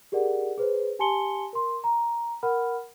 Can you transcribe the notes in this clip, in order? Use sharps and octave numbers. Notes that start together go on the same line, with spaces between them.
G4 G#4 A#4 D5 F#5
G#4 B4 C5
G4 G#5 A5 C6 C#7 G7
A#4 C6
A#5
A#4 F#5 B5 F6